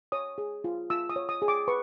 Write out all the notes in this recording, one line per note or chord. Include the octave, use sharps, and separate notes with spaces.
C#5 D#6
G#4
F4
F4 E6
D#6
C#5
D#6
G#4
D6
B4 C#6